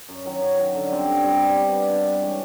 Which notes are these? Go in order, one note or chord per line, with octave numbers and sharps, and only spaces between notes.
F#2
D#3 F#3
F#2
D#3 F#3
D3
G3 C4
D3
G3 C4
G3
B3 D4
G3
B3 D4
C3
E3 G#3 C#4